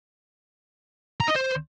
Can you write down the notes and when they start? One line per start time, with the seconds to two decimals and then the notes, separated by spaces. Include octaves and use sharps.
1.20 A#5
1.28 D#5
1.35 C5